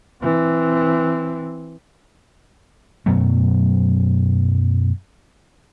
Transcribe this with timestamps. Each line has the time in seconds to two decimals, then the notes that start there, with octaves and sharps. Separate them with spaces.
0.22 E3 C4
3.06 F#2 B2 F#3 A3